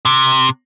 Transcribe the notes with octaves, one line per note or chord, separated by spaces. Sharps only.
C3